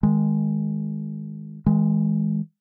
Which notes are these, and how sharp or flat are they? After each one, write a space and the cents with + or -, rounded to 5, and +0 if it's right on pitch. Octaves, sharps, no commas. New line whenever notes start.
D#3 +15 G#3 +0
E3 -45 G#3 +0